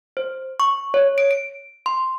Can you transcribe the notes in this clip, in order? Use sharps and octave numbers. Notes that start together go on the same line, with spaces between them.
C5
C#6
C#5
D7
D7
C6